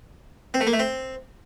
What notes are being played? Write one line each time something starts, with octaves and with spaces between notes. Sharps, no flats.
C4
A3
A#3
A3
C4